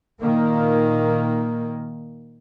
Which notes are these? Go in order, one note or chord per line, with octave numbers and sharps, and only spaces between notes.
A#2 D#3 A#3